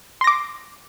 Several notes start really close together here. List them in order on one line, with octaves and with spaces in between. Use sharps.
C6 A#6 D6